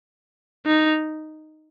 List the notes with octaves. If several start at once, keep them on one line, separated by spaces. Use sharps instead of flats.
D#4